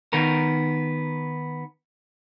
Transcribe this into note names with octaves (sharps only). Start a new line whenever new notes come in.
D#3 B3 A#4